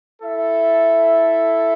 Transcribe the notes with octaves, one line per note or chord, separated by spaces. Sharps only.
E4 A4 E5